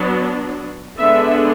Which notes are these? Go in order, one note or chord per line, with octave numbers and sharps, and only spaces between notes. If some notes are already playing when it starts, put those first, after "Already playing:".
Already playing: F#3 B3 D4
D3 G#3 B3 D4 E5